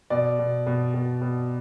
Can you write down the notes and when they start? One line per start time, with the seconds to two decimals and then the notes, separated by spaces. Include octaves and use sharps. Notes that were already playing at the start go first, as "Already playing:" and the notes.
0.10 B2 D5
0.39 B2
0.67 B2
0.94 B2
1.22 B2